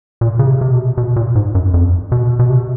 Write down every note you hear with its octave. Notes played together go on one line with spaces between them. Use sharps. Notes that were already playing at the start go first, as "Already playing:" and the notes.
A#2
C#3
C3
C3
B2
B2
A#2
G#2
F#2
F2
B2
B2
C3